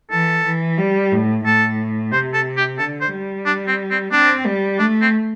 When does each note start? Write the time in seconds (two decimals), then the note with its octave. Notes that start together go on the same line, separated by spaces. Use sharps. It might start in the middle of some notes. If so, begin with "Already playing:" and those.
0.11 E3 A4
0.45 E3
0.78 G3
1.12 A2
1.45 A2 A4
2.12 C3 C5
2.34 A4
2.57 G4
2.79 D3 A4
3.01 C5
3.12 G3
3.46 D4
3.67 C4
3.91 C4
4.12 C4 D4
4.46 G3
4.79 A3 D4
5.01 C4